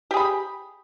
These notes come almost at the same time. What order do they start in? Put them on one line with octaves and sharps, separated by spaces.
G4 G#4 B5